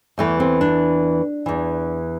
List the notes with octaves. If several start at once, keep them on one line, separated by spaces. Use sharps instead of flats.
E2 E3 A3
C4
D4
E2 E3